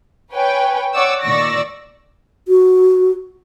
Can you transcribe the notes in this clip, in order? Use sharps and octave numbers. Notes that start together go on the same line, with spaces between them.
B4 C#5 G5 G#5
C#5 D5 F#5 C#6 D6 E6
A#2 D#3 D5 C#6 E6 A#6
F#4